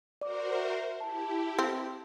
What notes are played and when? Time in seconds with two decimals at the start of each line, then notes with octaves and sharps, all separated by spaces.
0.21 F#4 A#4 C5 D5 D6
0.56 E5
1.00 E4 G4 A5
1.59 C4